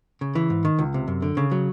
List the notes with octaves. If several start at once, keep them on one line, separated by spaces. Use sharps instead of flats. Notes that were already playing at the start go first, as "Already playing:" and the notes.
C#3
E3
G#2
D#3
C#2
C3
F#2
D3
C#3
F#3